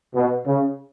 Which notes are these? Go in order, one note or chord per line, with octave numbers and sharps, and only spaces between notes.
B2
C#3